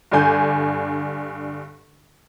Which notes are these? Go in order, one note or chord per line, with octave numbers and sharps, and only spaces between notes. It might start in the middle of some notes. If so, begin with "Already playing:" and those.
G2 D3 D4 G#5 G6